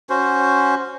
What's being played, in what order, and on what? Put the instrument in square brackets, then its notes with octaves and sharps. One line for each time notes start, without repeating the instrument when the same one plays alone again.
[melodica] C#4 F#4 C5